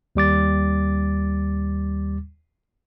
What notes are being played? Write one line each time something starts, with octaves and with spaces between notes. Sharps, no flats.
D#2 G3 D6 A6